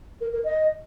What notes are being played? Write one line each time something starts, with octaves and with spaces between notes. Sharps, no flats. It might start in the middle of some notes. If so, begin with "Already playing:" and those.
A#4
A#4
D#5